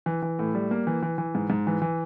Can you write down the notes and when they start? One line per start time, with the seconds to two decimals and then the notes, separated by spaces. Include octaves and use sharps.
0.06 E3
0.22 E3
0.39 A2
0.55 G3
0.71 A#3
0.87 E3
1.02 E3
1.18 E3
1.35 G#2
1.50 G#2
1.67 E3
1.82 E3